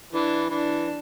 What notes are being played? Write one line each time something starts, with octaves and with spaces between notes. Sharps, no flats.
E3 D4
E3 D4